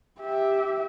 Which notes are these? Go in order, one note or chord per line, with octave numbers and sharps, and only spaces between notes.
G4 E5